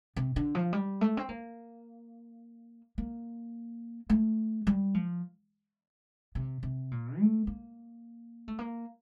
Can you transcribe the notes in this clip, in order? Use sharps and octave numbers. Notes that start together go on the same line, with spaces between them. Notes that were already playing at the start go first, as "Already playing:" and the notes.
C3
D3
F3
G3
A3
C4
A#3
A#3
A3
G3
F3
C3
C3
A#2
A3
A#3
A3
A#3